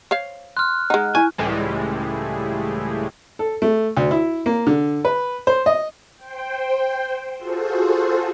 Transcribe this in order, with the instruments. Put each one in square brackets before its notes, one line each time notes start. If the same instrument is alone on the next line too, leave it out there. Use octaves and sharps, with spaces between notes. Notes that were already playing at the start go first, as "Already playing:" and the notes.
[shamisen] C5 C#5 F5
[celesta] C6 [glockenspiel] F6 F#6
[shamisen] G#3 D#4 [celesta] F#5
[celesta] E4 C#6 [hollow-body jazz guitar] G#5
[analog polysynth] C#2 A2 E3 G3 G#3
[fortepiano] A4
A3
D2
E4
A#3
D3
B4
C5
D#5
[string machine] C5 G5
F4 F#4 G#4 A4 C5